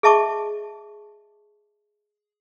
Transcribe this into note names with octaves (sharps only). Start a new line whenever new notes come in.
G#4 D#5 E5 A5 C#6 D6